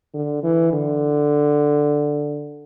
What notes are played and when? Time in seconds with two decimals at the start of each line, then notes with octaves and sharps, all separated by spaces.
0.14 D3
0.43 E3
0.73 D3